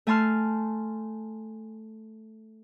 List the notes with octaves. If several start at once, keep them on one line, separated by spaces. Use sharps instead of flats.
A3 G#5 A5 C6 F6